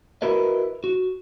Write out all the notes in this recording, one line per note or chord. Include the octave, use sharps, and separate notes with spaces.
E4 F#4 A#4 B4 D#5
F#4